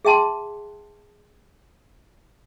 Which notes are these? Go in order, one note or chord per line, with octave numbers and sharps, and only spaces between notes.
G#4 E5 G5 A5 C6